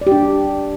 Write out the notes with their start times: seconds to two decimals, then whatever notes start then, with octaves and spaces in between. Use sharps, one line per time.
0.01 D5
0.07 G4
0.12 D4